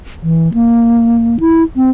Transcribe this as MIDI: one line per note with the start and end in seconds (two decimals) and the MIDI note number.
0.23 0.52 52
0.54 1.37 58
1.40 1.63 64
1.76 1.90 60